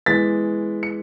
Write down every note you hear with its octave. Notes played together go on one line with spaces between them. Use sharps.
E3 G#3 B3 A6 B6
C#7